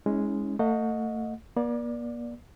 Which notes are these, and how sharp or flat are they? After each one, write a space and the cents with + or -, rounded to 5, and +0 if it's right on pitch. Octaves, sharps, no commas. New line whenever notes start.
G#3 +0 C#4 +0 E4 -40
A3 +30 D#5 +0 F#5 -35
A#3 +45 D5 +0